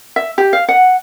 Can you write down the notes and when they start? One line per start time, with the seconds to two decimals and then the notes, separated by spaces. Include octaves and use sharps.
0.16 E5
0.38 G4
0.53 F5
0.69 F#5